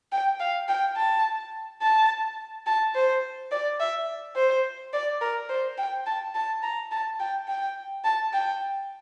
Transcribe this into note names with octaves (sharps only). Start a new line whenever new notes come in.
G5
F5
G5
A5
A5
A5
C5
D5
E5
C5
D5
A#4
C5
G5
A5
A5
A#5
A5
G5
G5
A5
G5